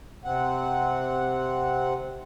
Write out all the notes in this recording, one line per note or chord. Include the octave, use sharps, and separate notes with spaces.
C3 C4 F#5